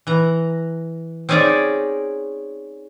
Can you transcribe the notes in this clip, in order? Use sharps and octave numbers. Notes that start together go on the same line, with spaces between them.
E3 A#5
C4 C#4 D#4 G#4 C#5 D5